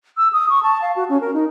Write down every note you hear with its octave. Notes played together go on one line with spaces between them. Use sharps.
E6
D#6
C#6
A5
F5
F#4
C#4
A#4
D#4